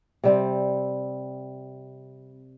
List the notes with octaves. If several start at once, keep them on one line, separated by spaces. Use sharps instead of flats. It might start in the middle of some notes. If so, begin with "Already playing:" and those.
C3 G3 C4